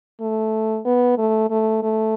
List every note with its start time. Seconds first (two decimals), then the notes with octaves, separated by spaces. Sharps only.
0.21 A3
0.85 B3
1.18 A3
1.50 A3
1.83 A3